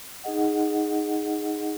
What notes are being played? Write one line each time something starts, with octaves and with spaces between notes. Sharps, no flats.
D#4 G#4 D#5 F#5